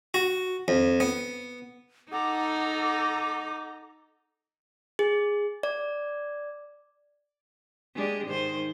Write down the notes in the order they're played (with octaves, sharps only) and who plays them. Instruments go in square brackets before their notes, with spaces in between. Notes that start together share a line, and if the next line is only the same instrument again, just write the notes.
[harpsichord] F#4
F2
B3
[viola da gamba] D#4 [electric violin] A4 A#5 [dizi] F#5 [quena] D6
[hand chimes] G#4
D5
[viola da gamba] G#3 D4 G4
G#2 D#3 C5